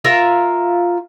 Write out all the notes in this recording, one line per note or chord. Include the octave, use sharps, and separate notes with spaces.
F4 A#4 E5